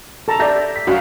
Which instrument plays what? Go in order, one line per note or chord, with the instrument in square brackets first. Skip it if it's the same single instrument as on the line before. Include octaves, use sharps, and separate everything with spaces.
[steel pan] A4 A5 A#5
[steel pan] G4 A4 D5 [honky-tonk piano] E5 G6 A#6
[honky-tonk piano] B6
[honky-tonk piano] C2 F#2 C#4 [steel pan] F#4 F5